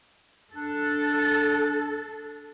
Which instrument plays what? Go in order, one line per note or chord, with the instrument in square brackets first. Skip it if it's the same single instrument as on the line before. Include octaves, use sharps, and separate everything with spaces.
[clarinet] D4 [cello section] A4